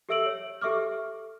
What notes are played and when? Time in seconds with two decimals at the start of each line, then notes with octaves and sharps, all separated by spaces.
0.09 G4 A4 E5 E6 D7 F#7
0.26 C#5
0.61 G4 A4 E5 C#6 D6 F6